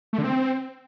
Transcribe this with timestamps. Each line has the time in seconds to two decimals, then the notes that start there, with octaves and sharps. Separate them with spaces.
0.13 A3
0.18 D3
0.24 C4